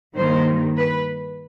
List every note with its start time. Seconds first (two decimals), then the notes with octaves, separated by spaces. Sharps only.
0.15 G2 D#3 G3 A#3 C5
0.77 B4